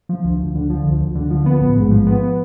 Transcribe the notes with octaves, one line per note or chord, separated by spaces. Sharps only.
F3
D2
D2
D3
F3
D2
D2
D3
F3
B3
A1
G#2
F3
B3